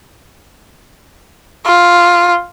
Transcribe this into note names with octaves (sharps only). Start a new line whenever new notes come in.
F4